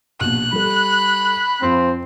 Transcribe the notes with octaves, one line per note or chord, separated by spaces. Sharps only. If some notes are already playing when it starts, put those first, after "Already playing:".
A#1 B2 F#6
G3 A4 B5
F2 F3 C4